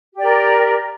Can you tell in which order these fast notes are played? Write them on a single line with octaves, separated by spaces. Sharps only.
G4 D5 A#4